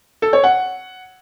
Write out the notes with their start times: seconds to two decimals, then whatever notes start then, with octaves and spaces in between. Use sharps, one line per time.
0.22 A4
0.33 C#5
0.44 F#5